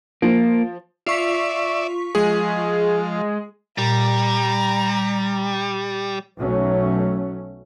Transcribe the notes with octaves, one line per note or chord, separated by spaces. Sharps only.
F3 A#3
F4 D5 E5 C#6 B6
F3 G#3 G#4
A#2 G3 A#5
B1 F#3 A3 C#4